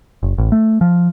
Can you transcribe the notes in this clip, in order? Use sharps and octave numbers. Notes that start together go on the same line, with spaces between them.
F#1
A1
A3
F3